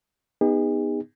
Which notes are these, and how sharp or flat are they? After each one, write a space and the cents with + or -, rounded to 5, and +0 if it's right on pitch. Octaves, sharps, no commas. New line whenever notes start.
B3 +0 D#4 +0 G#4 -45